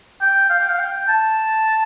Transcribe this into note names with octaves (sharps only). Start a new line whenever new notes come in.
G5
F5
G5
F5
G5
A5